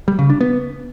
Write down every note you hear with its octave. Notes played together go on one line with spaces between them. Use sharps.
G3
C#3
D4
B3